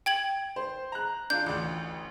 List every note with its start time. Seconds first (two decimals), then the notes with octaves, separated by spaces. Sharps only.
0.06 G5 G#6 F#7
0.56 C5
0.92 A#5 F#6
1.30 D4 F4 G6
1.46 A1 D2